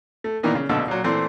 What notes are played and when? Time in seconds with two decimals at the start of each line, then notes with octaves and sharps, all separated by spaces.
0.24 A3
0.43 A#2 D#3 E3 A#3 B3
0.55 C#3
0.69 A#1 B2 D3 A3 A4 E6
0.88 A#2 F#3
1.04 A#2 E3 A3 C4